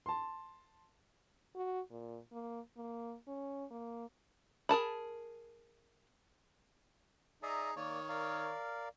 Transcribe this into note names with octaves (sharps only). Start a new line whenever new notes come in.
A5 C6
F#4
A#2
A#3
A#3
C#4
A#3
G#4 A#4 A5 B5
D#4 G#4 D5 E5 A#5
D#3 A#3 C#5 D5
A#4 D5 F5